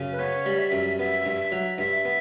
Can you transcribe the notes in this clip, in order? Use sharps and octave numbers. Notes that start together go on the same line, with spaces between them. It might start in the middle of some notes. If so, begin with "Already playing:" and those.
Already playing: F#2 C#3
B4
B3 C#5
G3
E5
F#2
B3 E5
G2
F#3
G2 E5
B3